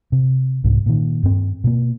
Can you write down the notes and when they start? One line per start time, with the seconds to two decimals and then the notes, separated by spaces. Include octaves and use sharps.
0.12 C3
0.64 C2 G#2
0.86 A#2 D#3
1.23 G2 C4
1.64 B2 A#3